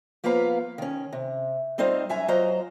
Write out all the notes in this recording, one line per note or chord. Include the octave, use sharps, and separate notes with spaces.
F3 A#3 B3 B4 F5 A#5
D#3 C#4
C3
G3 C4 D#4 F4 C5
F#2 E5 G#5 A#5
F#3 F4 C5 D#5 A#5